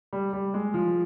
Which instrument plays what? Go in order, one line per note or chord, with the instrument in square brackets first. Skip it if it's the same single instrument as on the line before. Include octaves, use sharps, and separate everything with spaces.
[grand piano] G3
G3
G#3
F3